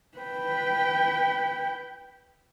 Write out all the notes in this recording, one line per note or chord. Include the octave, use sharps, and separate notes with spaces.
B4 G5